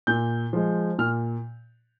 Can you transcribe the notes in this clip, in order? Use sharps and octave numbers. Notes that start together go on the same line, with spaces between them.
A#2 G6
F3 G#3
A#2 F6